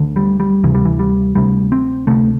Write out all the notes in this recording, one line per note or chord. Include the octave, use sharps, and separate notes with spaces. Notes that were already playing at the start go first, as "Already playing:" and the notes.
Already playing: D2 D3
G3
G3
D2 C3 E3
G3
E3
G3
D2 C3 G3
C4
D2 C3 A3